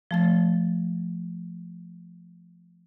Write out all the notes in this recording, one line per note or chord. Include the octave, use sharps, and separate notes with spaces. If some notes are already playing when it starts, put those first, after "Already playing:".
F3 A3 A6